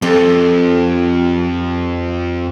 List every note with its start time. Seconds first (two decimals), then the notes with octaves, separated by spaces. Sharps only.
0.02 F2 G4 A4